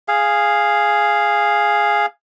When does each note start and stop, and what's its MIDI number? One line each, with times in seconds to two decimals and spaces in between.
0.08 2.06 68
0.08 2.06 77